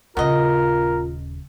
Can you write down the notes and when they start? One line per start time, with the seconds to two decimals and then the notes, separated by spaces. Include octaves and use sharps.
0.17 D#1 C#3 B3 F4 A#4 D#5